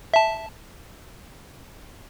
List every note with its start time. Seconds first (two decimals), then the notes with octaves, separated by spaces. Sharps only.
0.14 E5 A5